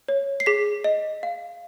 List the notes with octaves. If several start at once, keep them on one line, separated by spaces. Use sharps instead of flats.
C#5
C7
G#4 B6
D#5
F5